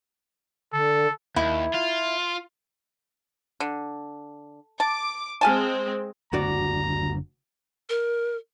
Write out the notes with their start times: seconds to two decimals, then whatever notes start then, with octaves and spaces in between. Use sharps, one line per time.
0.73 D3 A4
1.36 D#2 E4
1.74 F4
3.60 D3
4.80 A5 D6
5.41 G#3 C4 F5 G#5 A5
6.33 F#1 D2 D3 F#4 D5 A#5
7.89 A#4